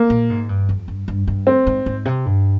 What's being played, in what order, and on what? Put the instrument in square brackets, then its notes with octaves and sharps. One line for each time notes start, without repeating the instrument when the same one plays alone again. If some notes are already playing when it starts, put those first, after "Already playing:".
Already playing: [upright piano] A#3
[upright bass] A#2
G#2
G2
F2
G2
G2
G2
[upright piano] C4
[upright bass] G#2
G#2
C3
G2